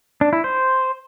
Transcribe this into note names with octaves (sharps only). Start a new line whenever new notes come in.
D4
E4
C5